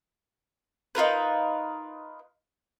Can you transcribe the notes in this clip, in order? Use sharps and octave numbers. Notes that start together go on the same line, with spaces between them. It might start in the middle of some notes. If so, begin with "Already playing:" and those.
D#4 F4 A#4 B4